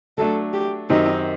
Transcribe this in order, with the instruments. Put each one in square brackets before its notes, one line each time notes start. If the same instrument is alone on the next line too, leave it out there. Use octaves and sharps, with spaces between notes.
[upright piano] F#3 A3 D4 [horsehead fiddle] A4
[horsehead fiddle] G4
[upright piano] F#2 D#3 F#3 C4 G4 [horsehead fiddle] D#4